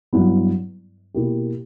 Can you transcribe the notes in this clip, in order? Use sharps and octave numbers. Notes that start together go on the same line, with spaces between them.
G2 F#3 B3 E4
B2 A#3 E4 G4